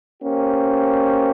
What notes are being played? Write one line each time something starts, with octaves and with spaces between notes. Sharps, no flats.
A#3 C#4 G4 C5